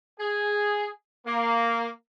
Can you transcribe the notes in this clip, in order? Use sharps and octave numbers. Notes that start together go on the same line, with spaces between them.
G#4
A#3